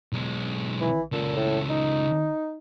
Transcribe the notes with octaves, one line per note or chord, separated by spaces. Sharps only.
B1 G#3
E3
C#2 A#2 A4
A2
D#4